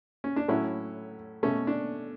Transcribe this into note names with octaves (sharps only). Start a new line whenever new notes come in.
C#4
D4
A2 F#3 A3 C#4 E4
B2 A3 C#4
D4